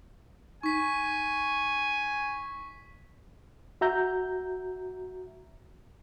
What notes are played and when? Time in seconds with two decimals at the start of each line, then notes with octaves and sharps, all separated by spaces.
0.63 D#4 G#5 C#6 B6
3.81 F#4 E5 A#5 G6